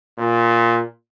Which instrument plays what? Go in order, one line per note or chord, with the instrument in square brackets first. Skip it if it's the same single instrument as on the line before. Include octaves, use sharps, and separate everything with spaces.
[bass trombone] A#2